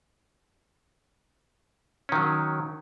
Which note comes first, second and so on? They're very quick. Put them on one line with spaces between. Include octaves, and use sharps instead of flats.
C#4 D#3 F#3